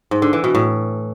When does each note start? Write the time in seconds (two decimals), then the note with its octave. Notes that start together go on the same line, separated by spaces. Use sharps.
0.11 G#2
0.22 D3
0.33 E3
0.44 B2
0.55 A2